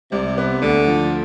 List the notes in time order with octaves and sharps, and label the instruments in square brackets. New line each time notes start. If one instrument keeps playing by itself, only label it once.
[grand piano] C2 [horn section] C3
[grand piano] B3
[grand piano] D2 [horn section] D3
[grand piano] F3